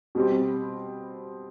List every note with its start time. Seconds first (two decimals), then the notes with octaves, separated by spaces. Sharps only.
0.15 B2 G3 C4